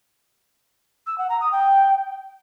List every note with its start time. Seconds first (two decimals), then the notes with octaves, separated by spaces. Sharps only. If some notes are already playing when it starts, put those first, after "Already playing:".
1.07 E6
1.18 F#5
1.29 A#5
1.41 D#6
1.52 G5